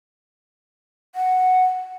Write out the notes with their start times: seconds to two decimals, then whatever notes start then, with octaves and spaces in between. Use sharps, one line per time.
1.15 F#5